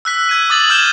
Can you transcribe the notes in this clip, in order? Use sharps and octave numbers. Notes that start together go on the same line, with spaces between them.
E6 F#6 B6
E6 G#6 D#7
D6 D#6 A6 F#7
D#6 F6 G6 G#6 E7 G7